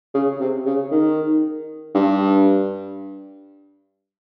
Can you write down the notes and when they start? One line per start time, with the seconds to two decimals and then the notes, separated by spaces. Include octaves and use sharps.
0.14 C#3
0.40 C3
0.66 C#3
0.91 D#3
1.95 G2